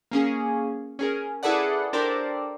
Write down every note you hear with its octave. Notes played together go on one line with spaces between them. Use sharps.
A#3 C#4 G#4
C#4 G#4 A#4
E4 G#4 A4 B4 D5 F#5
D4 G4 A4 A#4 C5 D5